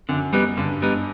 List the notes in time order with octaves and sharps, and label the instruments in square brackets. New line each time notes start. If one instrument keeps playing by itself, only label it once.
[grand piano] F#2 [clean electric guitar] D3
[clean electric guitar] G3 B3 D#4
[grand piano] G2 [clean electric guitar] D3
[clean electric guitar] G3 B3 D#4